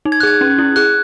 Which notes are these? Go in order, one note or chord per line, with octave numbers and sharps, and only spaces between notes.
D#4
G#6
F#6
G#4 G#6
C#4
E4
G#4 F#6